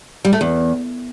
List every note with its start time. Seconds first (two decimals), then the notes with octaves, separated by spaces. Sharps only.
0.25 G3
0.33 A3
0.41 E2